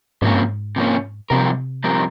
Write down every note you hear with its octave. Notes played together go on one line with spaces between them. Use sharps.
G#2 C3 F3 A#3 C#4
G2
G#2
C3 F3 A#3 C#4
G2 C3 F3 C4 G4 A#4
G2 F3 C4 G4 A#4